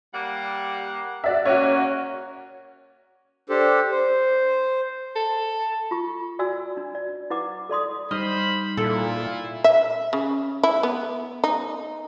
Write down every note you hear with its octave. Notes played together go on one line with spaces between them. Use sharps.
G3 A#3 F#5
F#4 D5 E5
A#3 C#4 F#4 C#5
D4 G4 A4 C5
C5
A4
F4 C#6
F#4 D5 G#5 E6
D4
D5
E4 B4 F#5 D6
A4 D5 C6 D#6
G3 D#4 C5 D#5 B5 F6
A#2 E4 F4 A4
E5
C#3
E4
B3
D#4